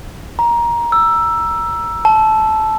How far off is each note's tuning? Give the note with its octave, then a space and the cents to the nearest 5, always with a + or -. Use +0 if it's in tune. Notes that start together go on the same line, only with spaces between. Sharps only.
A#5 +15
E6 +10
A5 -15